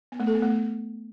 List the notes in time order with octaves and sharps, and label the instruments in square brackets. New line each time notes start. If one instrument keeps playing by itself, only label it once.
[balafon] B3
A3
A4
B3
A3